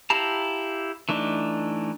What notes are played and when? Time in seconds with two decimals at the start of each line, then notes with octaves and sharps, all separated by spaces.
0.10 E4 G4 F5 A5 A#5
1.09 E3 A3 D4 D#4